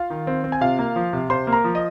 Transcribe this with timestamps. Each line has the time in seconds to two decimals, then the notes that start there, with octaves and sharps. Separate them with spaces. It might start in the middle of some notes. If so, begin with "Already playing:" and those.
Already playing: F4 F5
0.10 D#3
0.27 C4
0.44 C4
0.52 G#5
0.61 C3 F4 F5
0.79 A#3
0.96 F3
1.13 C3
1.30 C3 C5 C6
1.47 A#3
1.53 A#4 A#5
1.64 F3
1.75 D#5